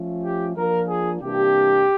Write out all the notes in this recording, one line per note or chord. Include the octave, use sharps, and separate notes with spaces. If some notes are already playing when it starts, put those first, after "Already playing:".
Already playing: F3 A3 C#4 F4
G4
F3 A#3 D4 F4 A#4
G#4
C3 E3 G3 A#3 D4 G4